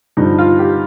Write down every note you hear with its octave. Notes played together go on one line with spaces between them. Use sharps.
G2 D3 F3 D#4
F4
G4